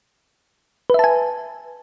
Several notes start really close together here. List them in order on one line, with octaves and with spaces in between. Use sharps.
B4 E5 A5 G#5